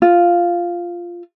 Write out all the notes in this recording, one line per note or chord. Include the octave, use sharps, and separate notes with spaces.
F4